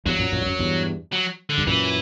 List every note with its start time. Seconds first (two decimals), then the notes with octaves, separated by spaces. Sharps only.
0.06 E2 G2 F#3
0.19 F#2 A#2
0.32 F#2 A#2
0.42 G2
0.47 F#2
0.59 E2 G2
1.13 F#3
1.50 D3
1.58 G2
1.67 F#2 A#2 E3